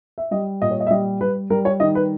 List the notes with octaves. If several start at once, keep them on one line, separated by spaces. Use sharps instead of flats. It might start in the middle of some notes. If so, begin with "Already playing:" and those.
E5
G3 D#5
A#2 D#5
C#5
D#5
E5
G3 D#5
G3 B4
G3 A#4
C#5
D#3 D#5
B4